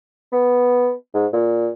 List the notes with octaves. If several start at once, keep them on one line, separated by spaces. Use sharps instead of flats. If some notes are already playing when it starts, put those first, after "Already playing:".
B3
G#2
A#2